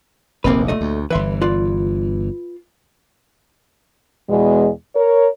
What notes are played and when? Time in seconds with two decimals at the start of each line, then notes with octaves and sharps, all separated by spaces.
0.44 F1 A#1 D#2 A#3 C4 B4
0.68 A#2 A3 D#5
0.81 D2
1.10 G1 E3 B4 E5 C6
1.41 F4 B4 D5
4.30 E2 B2 G#3
4.95 A#4 C#5